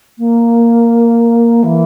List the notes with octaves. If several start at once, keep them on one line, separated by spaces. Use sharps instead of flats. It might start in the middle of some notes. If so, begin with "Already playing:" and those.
A#3
E3